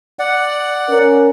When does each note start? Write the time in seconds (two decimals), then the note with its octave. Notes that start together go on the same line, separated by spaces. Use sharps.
0.19 D5 F#5
0.89 C#4 A#4